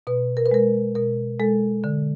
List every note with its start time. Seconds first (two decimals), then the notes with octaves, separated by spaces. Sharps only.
0.07 B2 B4
0.37 A#4
0.46 B4
0.51 G#3 A#4
0.95 B2 A#4
1.40 G#3 A4
1.84 D3